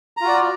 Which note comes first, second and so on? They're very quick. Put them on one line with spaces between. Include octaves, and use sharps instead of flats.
A#5 F4 F#4 D5